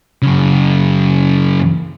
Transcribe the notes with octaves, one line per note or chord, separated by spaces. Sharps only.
F#2 C#3